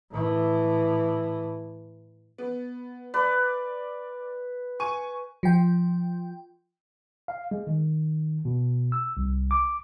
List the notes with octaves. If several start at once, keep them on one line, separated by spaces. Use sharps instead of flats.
A2 E3
B3
B4 D5
G#5 C#6 D#7
F3 G5
F5
G#3
D#3
B2
E6
C2
D6